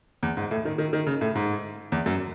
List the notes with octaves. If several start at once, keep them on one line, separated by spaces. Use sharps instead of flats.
E2
G#2
A2
D#3
D#3
D#3
C#3
A2
G#2
E2
F#2